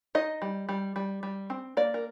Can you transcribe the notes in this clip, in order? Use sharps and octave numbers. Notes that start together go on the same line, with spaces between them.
D#4 D#5
G3
G3
G3
G3
C4
A#3 D5
A#4